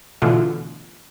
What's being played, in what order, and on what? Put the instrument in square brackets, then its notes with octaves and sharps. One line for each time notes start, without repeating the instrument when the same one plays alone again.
[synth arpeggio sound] B2 D3 E3 A3 F4